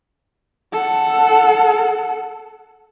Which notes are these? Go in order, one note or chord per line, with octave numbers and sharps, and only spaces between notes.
A4 F#5